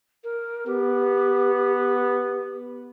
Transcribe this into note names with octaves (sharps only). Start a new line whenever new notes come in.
A#4
B3 G4